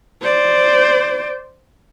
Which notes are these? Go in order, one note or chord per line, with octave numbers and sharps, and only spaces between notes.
C5 D5